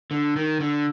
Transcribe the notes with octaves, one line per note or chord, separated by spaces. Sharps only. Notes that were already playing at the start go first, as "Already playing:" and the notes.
D3
D#3
D3